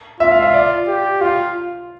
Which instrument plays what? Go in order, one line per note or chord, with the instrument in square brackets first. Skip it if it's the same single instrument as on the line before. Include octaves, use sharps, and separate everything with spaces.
[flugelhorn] F4 [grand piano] E5
[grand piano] F5
E5
D5
[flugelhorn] G4
[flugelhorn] F4 [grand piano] F5